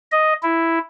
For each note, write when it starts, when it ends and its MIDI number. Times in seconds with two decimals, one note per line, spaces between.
0.12 0.33 75
0.43 0.79 64